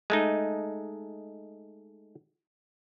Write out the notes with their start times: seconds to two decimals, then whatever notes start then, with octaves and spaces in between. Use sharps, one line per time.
0.10 G#3 A3 D#4